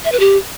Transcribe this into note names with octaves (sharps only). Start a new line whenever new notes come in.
E5
B4
G4